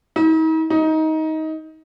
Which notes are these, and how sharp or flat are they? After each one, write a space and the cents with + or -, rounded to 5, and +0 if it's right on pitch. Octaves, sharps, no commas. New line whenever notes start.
D#4 +45
D#4 +20